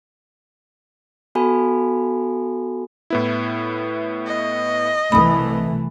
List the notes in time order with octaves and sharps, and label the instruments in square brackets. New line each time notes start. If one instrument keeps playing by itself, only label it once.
[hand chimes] B3 F#4 A4 G#5 B5
[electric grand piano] A2 B3 E4
[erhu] D#5
[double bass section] C2 E3 A3 [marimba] B5 D#6